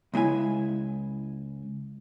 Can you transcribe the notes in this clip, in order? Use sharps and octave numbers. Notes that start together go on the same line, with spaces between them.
C#2 G#3 E4 G#5